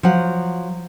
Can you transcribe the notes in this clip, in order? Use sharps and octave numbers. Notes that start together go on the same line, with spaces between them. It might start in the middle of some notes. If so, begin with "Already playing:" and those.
F3 F#3 F#5